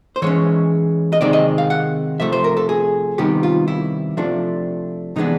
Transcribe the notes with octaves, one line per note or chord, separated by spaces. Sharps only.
C5
E3 G#3 C#4 C#5
D#5
C3 D#3 G#3 C4 D5
D#5
F5
F#5
C3 F3 A3 E5
C5
A#4
A4
G#4
C3 D#3 G3 B3 G4
F4
E4
C3 F3 A3 D4
C3 E3 G#3 B3 D4 D#4